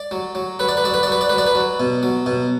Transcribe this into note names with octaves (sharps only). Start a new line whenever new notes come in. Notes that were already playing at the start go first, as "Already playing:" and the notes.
Already playing: D5
F#3
F#3
F#3 B4
D5
B4
F#3 D5
B4
D5
F#3 B4
D5
F#3 B4
D5
B4
F#3
B2
F#3
B2